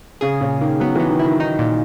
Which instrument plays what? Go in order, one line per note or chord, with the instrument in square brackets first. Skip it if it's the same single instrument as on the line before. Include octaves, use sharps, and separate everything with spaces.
[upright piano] C#3 [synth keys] G#4
[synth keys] A#2 [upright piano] C#3
[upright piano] D#3 [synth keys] A#3
[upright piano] F#3 [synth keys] B3
[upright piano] E3 [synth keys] B3
[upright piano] D#3
[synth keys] E4
[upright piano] D#3
[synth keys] D#4
A#2